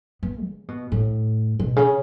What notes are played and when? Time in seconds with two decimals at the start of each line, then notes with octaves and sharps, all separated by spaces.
0.23 B3
0.45 C#3
0.68 B2
0.92 A2
1.59 B2
1.76 C#3